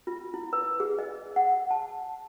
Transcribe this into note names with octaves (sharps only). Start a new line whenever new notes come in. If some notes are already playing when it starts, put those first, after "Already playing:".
F4
E4
B4
G#4
D#5
F#5
A5